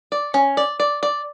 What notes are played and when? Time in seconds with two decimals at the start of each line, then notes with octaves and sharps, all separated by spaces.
0.12 D5
0.34 C#4
0.57 D5
0.80 D5
1.03 D5